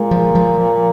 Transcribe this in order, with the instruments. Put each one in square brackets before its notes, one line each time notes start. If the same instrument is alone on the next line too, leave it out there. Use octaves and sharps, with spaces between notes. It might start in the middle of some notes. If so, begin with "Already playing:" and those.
Already playing: [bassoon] A#2 [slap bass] G#3
[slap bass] F3
F3